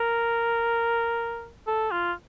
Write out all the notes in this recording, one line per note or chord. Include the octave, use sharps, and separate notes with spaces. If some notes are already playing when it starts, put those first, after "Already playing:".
Already playing: A#4
A4
F4